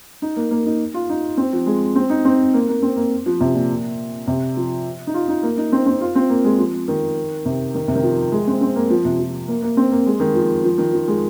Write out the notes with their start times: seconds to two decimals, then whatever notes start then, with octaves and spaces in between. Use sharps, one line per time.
0.22 D#4
0.36 A#3
0.51 A#3
0.66 D#4
0.94 F4
1.09 D#4
1.37 C4
1.53 F3
1.66 G#3
1.95 C4
2.10 D#4
2.25 C4
2.54 A#3
2.69 A#3
2.82 C4
2.96 A#3
3.26 F3
3.40 C3
3.54 A#2
4.27 C3
4.57 F3
5.07 D#4
5.14 F4
5.28 D#4
5.43 A#3
5.57 D#4
5.72 C4
5.86 C4
6.01 F4
6.15 C4
6.30 A#3
6.44 G#3
6.59 F3
6.88 D#3
7.45 C3
7.74 D#3
7.88 C3
7.95 D#3
8.03 F3
8.32 G#3
8.47 C4
8.61 C4
8.76 A#3
8.90 F3
9.05 C3
9.20 F3
9.48 A#3
9.62 A#3
9.77 C4
9.92 A#3
10.06 G#3
10.20 D#3
10.35 F3
10.64 F3
10.78 D#3
10.93 F3
11.08 G#3